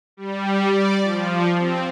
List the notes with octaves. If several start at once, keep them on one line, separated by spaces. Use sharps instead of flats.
G3
D5
F3
C4